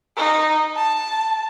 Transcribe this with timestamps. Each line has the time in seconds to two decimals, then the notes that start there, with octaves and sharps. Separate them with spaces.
0.17 D#4
0.76 A5